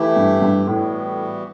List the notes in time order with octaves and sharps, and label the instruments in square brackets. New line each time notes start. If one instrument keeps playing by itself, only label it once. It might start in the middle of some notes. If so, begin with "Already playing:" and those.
Already playing: [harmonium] E3 A3 E4 G4
[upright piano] G2
G2
[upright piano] A2 [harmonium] E3 G3 B3 F#4